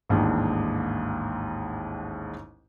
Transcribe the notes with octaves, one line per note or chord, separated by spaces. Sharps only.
A1 D#2 G#2 D4